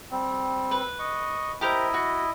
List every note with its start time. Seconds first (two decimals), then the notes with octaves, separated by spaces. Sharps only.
0.11 G3 C4
0.71 B4
0.99 D#5 C#6
1.61 E4 G4 A#4 C5 D#5
1.94 F#4